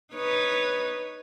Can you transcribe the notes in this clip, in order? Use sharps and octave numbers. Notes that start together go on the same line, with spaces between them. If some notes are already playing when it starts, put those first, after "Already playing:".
D#4 B4 C#5